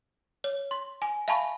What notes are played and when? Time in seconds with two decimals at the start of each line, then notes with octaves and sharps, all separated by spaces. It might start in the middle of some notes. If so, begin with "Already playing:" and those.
0.44 C#5
0.71 C6
1.02 G#5
1.28 E5 F5 G#5 A5 B5 C#6